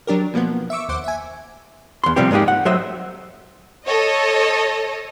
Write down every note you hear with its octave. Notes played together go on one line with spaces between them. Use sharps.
F#3 D4 G4 A#4
B2 F3 A#3 B3
E5 C#6 D6 E6
D#2 C5 F#5 D6
E5 G#5
E2 C6
C3 F3 G3 C4 G4
G#2 G#3 A#3 D#4 G4
F#5
F#3 A3 C5 D#5 E5
A4 C#5 D#5